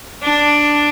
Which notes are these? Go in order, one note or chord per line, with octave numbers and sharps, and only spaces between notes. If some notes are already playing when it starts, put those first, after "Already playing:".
D4